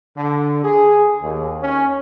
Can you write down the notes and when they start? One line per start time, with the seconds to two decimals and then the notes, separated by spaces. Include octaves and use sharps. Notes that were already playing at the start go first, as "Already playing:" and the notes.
0.17 D3
0.65 G#4
1.22 D#2
1.62 C#4